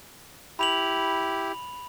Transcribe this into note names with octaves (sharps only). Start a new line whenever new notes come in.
E4 G4 B5 F7 F#7